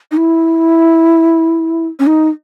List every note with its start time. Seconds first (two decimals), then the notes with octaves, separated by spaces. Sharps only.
0.12 D#4
0.17 E4
2.00 C#4
2.07 D#4